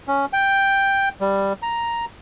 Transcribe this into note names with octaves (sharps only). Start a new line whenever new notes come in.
C#4
G5
G3
A#5